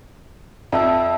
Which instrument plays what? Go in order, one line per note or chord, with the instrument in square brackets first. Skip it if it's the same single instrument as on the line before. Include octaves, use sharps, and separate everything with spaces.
[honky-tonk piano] F2 [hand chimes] D5 E5 E6